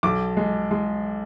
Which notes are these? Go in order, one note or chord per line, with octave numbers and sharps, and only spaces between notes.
B1 D6
G#3
G#3